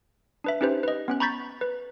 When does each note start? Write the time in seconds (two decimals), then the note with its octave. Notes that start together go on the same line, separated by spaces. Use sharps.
0.44 D4 B4 E5
0.61 C#4 D#4 G4 B4 C5
0.83 B4 D#5
1.08 B3 C#4 F#6
1.20 A#5 B5 C#6 G6 A6 B6
1.61 B4